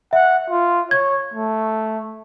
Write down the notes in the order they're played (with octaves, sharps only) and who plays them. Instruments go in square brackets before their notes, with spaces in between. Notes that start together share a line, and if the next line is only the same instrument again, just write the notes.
[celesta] E5 [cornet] F#5
[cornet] F4
[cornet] C#5 [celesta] G#6
[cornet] A3